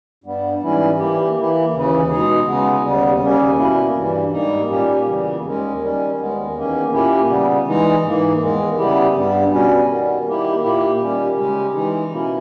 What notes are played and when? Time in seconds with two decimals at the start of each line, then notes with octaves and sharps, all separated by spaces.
0.24 G2 G3 B3
0.61 G#2 E3 G3 C#4 E4
0.99 E3 A#3 E4 G4
1.36 E3 A#3 E4
1.73 D#2 C#3 E3
2.10 B2 G#3 D#4 G#4
2.46 C#3 G#3 B3
2.84 D#2 C#3 G3 B3
3.21 D#2 C#3 G3 A#3 C#4
3.58 B2 A#3 C#4 E4
3.95 G2 E3 G3
4.32 G#2 G3 A#3 D#4
4.69 A#2 G3 A#3 C#4 G4
5.06 E2 C#3 E3 G3 A#3
5.44 D#2 D#3 G#3 C#4
5.81 D#3 G3 C#4
6.17 D#2 D#3 G#3 B3
6.55 E2 D#3 A#3 C#4
6.92 A#2 A#3 C#4 E4 G4
7.29 C#3 G3 B3
7.66 E3 G#3 D#4
8.03 G#2 E3 A#3
8.40 E2 D#3 G#3
8.77 C#3 G3 B3 E4 G4
9.15 G2 G3 B3
9.52 B2 G3 C#4
9.88 D#3 G3 B3
10.25 D#3 A#3 E4 G4
10.62 A#2 A#3 E4 G4
11.00 D#3 G3 C#4 G4
11.37 C#3 G#3 C#4 G4
11.74 E3 G#3 D#4
12.12 B2 A#3 C#4 E4